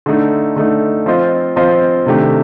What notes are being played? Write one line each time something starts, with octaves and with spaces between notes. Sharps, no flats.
D3 A3 D#4
D3 A3 D#4
F3 C4 F4 C5 D#5
F3 C4 F4 C5 D#5
C3 D#3 A3 D4 G4